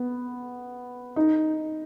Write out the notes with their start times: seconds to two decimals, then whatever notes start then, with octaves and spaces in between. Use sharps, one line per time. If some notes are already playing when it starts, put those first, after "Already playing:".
Already playing: B3
1.16 D#4